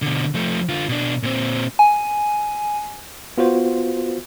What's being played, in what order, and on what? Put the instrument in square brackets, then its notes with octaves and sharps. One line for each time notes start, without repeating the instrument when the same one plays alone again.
[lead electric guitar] B2 D3
F3 A3
D3 F4
B2 D4
A#2 C4
[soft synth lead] G#5
[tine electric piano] B3 F4 F#4 C5